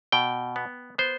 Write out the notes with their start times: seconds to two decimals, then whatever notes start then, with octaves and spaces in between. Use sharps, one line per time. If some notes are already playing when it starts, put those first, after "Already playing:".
0.12 B2 G5
0.56 B3
0.98 B3 C5